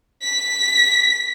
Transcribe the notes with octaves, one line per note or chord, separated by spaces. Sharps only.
B6